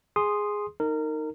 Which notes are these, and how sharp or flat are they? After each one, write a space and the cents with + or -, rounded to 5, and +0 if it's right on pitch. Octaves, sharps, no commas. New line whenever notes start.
G#4 +0 C6 +0 D#6 -10
D#4 +0 A#4 -25